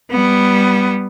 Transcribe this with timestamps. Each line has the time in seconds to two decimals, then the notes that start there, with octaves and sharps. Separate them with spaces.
0.11 G3 B3